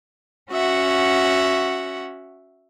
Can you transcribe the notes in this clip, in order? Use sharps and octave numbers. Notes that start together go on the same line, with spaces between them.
C#4 F#4 E5 F#5